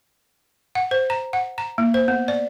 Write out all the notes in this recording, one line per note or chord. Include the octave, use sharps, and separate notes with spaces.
F#5
C5
A#5
F#5
A#5
A#3
C5
B3
D5